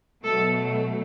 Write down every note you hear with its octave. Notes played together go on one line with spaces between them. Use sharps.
B2 F#3 A3 A4